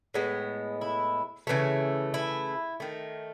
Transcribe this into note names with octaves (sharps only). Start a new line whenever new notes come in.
A2 G#3 B3
E4
C#3 E3 A3
E4
D#3 A3